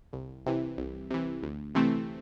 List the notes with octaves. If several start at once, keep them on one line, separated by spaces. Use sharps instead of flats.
C2
C3 E3
C2
C3 E3
D2
C3 E3 A3 C4